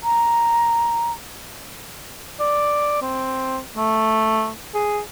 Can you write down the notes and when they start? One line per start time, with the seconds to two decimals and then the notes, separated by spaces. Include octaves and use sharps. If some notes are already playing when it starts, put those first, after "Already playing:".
0.03 A#5
2.40 D5
3.02 C4
3.77 A3
4.75 G#4